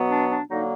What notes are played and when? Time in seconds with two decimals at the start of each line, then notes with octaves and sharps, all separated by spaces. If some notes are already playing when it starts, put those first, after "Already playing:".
Already playing: B2 F#3 B3
0.11 D4
0.30 D4
0.49 D3 F#3 A#3 D#4